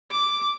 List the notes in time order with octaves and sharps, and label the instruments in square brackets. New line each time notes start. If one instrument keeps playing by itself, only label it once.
[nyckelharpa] D6